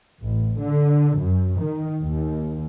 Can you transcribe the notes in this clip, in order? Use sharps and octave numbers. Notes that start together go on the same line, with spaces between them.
A1
D3
F#2
D#3
D#2